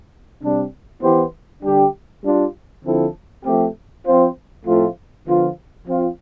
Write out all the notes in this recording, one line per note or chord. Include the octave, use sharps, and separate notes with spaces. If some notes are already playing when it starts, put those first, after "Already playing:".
C3 G3 D4
E3 B3 E4 G4 C5
D3 G3 D4 G4
G3 D4 F4
D3 F3 C4 E4 A4
F3 A3 C4 G4
F3 C4 F4 C5
A2 F3 A3 C4 F4
D3 F3 B3 F4
F3 C4 F4